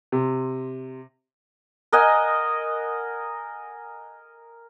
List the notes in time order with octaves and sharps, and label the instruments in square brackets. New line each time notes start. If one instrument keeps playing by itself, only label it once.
[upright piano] C3
[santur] A#4 D#5 F#5 G#5